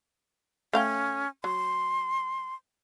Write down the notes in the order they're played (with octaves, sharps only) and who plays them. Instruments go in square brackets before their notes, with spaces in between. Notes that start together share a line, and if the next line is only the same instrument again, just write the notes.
[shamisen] A3 F5 G5 [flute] C#4
[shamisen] F#3 [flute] C6